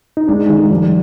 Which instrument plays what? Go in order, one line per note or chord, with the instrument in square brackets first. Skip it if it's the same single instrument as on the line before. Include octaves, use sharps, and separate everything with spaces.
[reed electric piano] D#4
[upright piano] G#3 [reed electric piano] D4
[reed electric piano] D#3 [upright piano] D#4 G#4
[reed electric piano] F3 [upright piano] G3